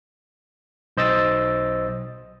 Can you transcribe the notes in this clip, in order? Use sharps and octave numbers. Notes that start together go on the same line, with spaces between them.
B1 C5 D#5 E6 A6